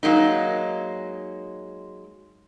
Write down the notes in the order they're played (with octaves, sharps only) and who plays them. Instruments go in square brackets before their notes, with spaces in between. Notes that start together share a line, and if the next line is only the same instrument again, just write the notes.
[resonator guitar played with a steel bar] F#3 G#3 A#3 D#4